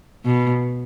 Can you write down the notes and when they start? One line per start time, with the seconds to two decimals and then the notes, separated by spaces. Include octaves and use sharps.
0.25 B2